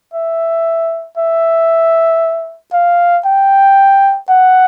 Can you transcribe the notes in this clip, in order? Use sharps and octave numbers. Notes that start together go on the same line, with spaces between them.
E5
E5
F5
G5
F#5